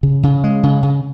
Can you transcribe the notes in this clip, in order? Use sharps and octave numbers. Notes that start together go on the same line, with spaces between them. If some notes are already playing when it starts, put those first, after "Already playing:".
C#3
C#3
G#3
C#3
C#3